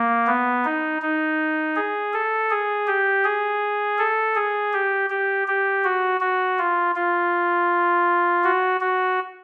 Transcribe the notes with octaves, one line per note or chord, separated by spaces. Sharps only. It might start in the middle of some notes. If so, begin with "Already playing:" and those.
Already playing: A#3
B3
D#4
D#4
G#4
A4
G#4
G4
G#4
A4
G#4
G4
G4
G4
F#4
F#4
F4
F4
F#4
F#4